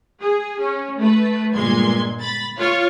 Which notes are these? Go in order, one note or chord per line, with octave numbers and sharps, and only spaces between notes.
G#4
C#4
A3 B4
G1 A#2 G#3 C6 G#6
B5 A6
F4 C#5 F5